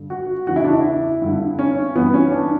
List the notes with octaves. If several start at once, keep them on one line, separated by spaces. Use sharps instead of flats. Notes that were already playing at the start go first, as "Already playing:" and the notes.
Already playing: G2 D3
F#4
E2 C#3 E3 F#4
E4
D4
E4
G2 D3
C#4
G2 E3 B3
C#4
D4